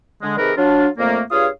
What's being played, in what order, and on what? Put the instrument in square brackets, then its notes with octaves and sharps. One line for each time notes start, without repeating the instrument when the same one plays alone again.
[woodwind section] D3 G#3
C3 D#3 G4 G#4 A#4 B4
F#3 D4 F4
F2 A#2 A3 A#3
G2 F4 G#4 C#5 F5 D#6